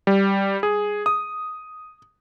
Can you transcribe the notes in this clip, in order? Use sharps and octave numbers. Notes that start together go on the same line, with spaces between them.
G3
G#4
D#6